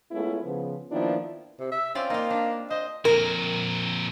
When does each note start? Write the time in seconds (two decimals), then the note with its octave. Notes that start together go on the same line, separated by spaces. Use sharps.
0.11 G#3 A3 B3 C#4 E4 F4
0.43 C#3 F3 B3
0.91 D#3 F3 A#3 B3 D4 E4
1.60 C3
1.72 E5
1.95 C4 C#4 F4 D5
2.10 A#3 D#4 F4
2.30 D4
2.71 C5 D#5
3.05 F2 A#2 A#4